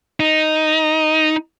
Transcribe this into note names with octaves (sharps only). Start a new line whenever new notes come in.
D#4